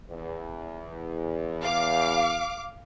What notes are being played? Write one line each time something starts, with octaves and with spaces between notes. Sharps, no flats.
E2
F5 D6